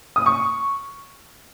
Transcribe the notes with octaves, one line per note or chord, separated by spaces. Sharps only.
D#6
C#6